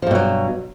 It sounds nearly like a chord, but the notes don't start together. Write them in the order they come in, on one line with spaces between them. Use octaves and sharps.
F3 G2 B2 F#3